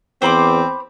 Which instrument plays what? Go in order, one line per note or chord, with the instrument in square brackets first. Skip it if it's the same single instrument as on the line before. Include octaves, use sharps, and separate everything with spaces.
[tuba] E2 [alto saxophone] C4 [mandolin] C5 B5 D6